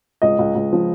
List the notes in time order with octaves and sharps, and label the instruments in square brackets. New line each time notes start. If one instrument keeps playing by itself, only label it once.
[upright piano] C#2 D#5
C#2
C#2
F3